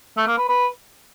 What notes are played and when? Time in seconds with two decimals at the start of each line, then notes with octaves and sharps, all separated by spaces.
0.17 A3
0.28 A#3
0.38 B4
0.49 B4